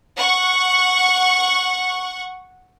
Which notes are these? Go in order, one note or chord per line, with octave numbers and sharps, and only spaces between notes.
F#5 C#6